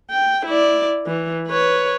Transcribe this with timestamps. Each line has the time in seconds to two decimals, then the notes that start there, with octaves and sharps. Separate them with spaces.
0.10 G5
0.46 E4 D5
1.06 E3
1.48 B4 C#5